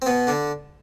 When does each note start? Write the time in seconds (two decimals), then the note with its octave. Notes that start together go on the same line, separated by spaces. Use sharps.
0.02 C4
0.06 B2 B3
0.27 D3 D4